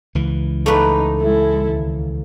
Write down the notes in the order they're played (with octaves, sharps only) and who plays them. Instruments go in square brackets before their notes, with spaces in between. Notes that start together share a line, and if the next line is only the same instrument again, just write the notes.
[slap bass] C#2 E3
[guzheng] A3 A#3 B4 [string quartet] D#4
[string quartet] G#3 E4 A4
D#2